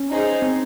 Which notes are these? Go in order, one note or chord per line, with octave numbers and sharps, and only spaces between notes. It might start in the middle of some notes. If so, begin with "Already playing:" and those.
Already playing: C#4
D#4 G#4 C5
C4